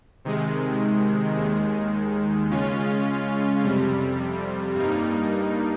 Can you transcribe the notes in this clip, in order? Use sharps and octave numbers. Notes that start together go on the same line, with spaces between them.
C3 D#3 G#3
D#2 D#3 G#3
C#3 G#3 C#4 F4
F2 C3 G3
G2 G3 A#3 D#4